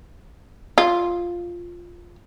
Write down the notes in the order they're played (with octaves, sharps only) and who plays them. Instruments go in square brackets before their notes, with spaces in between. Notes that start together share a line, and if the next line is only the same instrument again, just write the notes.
[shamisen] F4